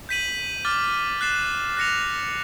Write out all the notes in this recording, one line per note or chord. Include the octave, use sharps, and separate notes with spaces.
G6 B6 D#7 F#7
D6 F6 A6
F#6 A6 C7 E7
F#6 A#6 C#7 F7